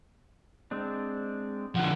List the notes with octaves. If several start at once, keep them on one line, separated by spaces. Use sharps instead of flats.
G#3 C4 D4
D3 F3 F#5